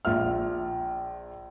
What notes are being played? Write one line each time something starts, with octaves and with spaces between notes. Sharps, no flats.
A#1 F4 E5 F6